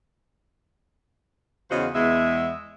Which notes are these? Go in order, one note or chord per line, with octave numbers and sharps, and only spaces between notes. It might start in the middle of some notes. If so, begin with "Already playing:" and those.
E2 C#3 F4 F#4 C5 D#5
E2 G#3 E5